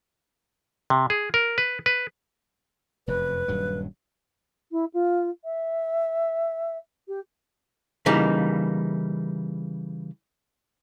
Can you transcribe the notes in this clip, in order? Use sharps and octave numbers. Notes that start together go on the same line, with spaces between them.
C3
G#4
A#4
B4
B4
F1 F#2 B4
D#1 G2 F#3
E4
F4
E5
G4
C#3 E3 G3 A#3 D#4